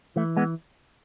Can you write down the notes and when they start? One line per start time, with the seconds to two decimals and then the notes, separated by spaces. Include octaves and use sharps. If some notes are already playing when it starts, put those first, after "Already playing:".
0.16 E3 A3
0.37 G#3 B3